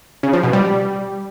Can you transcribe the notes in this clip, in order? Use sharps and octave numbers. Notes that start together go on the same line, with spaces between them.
C#3
F3
B2
G3